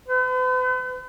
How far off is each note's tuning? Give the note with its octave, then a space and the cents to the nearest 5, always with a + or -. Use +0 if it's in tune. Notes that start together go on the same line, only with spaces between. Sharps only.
B4 +45